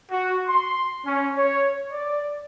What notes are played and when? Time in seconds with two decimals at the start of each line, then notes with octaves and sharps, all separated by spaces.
0.11 F#4
0.47 C6
1.05 C#4
1.37 C#5
1.92 D5